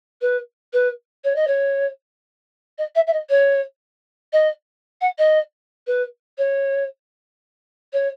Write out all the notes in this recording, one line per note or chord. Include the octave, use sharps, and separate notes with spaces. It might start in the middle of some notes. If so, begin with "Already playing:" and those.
B4
B4
C#5
D#5
C#5
D#5
E5
E5
D#5
C#5
D#5
F#5
D#5
B4
C#5
C#5